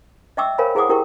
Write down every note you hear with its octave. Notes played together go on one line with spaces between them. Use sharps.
D#5 E5 G5 C#6 D6 E6
A#4 C5 C#5 F5 G#5 B5
E4 G#4 C5 F#5 D6 D#6
E4 G4 A#4 G5 C#6